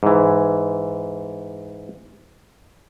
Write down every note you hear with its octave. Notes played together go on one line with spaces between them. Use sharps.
G#2 E3